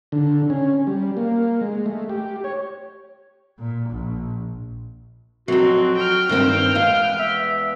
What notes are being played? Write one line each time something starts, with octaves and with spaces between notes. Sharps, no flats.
D3
C#4
G3
A#3
G#3
A3
G4
C#5
A#2
A#1
F2 F#3 C4 F#4
G5 F6
G2 D#3 C4
E2 G#3 B3 F5
E5